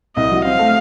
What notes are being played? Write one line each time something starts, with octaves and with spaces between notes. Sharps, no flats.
C2 D#5
F#3
C4 F5
A3